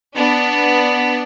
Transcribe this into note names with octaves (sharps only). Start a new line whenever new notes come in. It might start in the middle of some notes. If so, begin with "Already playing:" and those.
B3 D4